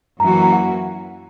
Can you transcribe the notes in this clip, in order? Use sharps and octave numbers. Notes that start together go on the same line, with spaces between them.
F#2 E3 A#3 C#4 F#4 A#5
A#5
A#5
F#5